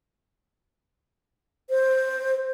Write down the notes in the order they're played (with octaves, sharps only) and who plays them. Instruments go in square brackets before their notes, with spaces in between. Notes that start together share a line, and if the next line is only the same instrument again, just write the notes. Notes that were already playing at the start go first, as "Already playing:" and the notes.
[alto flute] C5